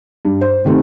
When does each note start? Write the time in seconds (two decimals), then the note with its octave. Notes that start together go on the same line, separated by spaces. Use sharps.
0.25 G2
0.41 C5
0.65 C3 D#3 A3 C4